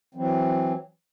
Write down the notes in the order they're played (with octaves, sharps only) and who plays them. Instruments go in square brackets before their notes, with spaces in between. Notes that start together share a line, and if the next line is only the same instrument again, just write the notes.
[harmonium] E3 F#3 C4